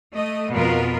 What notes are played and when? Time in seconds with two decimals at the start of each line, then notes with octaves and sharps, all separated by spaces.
0.15 A3 D#5
0.52 F2 B2 B3 F4 A#4